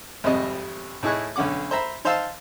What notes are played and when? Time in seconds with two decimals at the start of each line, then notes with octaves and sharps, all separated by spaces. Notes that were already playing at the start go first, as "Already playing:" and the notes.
0.24 G#1 F2 C3 G3 D#5
1.03 A2 D#4 E4 G#4 C#6 F#6
1.36 B1 D3 C#4 F#5 D6
1.71 C5 E5 A#5 B5
2.05 D#4 C5 F5 A5 E6